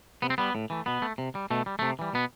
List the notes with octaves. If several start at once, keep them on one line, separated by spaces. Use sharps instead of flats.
C3 B3
C4
G3 B3
A2
E3 A3
B2 B3
A3
C3
G3
B2 A3
G3
C3 A3
E3 G3
B2 B3